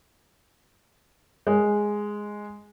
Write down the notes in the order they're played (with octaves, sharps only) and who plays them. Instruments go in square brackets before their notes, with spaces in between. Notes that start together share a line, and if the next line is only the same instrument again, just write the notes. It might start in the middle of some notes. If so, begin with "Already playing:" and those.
[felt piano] G#3